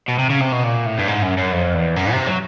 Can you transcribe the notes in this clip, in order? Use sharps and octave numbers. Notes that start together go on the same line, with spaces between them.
B2
C3
C#3
C3
B2
A#2
A2
G2
G#2
F#2
F#2
F2
E2
F#2
C3
F#3